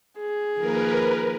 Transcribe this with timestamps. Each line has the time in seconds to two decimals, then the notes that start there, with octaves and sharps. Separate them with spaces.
0.19 G#4
0.58 D#3 F3 A#3 A#4 B4